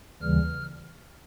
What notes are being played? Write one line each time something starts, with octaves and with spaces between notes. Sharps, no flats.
D#2 C#3 E3 G3 F6